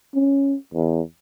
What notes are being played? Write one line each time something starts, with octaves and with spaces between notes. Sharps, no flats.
C#4
E2